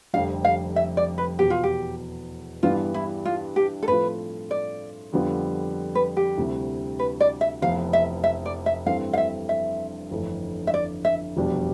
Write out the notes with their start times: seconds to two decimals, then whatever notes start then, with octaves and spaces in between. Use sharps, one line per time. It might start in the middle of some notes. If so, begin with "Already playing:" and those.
0.13 F1 F2 D3 G3 F5
0.45 F5
0.76 E5
0.97 D5
1.18 B4
1.39 E2 B2 B3 G4
1.50 F4
1.63 G4
2.63 G2 E3 G3 B3 D4 F4
2.94 E4
3.25 F4
3.56 G4
3.83 A4
3.88 A2 F3 A3 C4 F4 B4
4.51 D5
5.13 F2 D3 G3 B3 F4
5.95 B4
6.17 G4
6.37 D2 C3 G3 C4 E4
6.99 B4
7.21 D5
7.41 E5
7.62 F1 F2 E3 B3 E4 F5
7.93 E5
8.24 E5
8.46 D5
8.66 E5
8.86 G2 E3 A3 C4 F5
9.13 F5
9.18 E5
9.49 E5
10.11 G1 F2 E3 A3
10.67 E5
10.74 D5
11.05 E5
11.36 F1 E2 B2 G3 D4